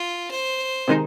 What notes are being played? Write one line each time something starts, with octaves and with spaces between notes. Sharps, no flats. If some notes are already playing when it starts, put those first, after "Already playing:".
Already playing: F4
C5
C3 D#3 G#3 D#4